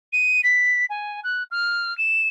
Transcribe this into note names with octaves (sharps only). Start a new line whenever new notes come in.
D#7
B6
G#5
F#6
F6
E7